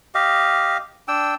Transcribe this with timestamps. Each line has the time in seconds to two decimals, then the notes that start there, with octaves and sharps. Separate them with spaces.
0.15 G4 D#5 F5
1.08 D4 G5 E6